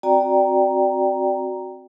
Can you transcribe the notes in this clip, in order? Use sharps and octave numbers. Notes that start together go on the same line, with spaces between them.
C4 F#4 D5 G5 A#5